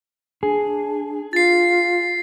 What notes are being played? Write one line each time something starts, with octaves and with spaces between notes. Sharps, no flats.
D4 G#4
F4 A6 C7